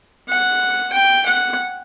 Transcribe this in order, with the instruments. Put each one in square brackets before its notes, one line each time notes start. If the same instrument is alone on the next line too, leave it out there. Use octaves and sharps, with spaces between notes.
[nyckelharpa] F#5
G5
F#5